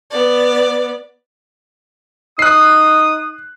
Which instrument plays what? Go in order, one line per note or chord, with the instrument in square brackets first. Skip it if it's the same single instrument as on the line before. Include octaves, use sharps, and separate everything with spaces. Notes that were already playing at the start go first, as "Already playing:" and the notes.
[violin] B3 D5
[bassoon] D#4 [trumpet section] D#6 [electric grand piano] F#6 C7